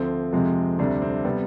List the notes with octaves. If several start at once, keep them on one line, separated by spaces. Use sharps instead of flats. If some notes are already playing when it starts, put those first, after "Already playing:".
Already playing: D2 D3 F3 C4
F2 C3 F3 G#3
D2 C3 G3 D4
C4
C3 G3 B3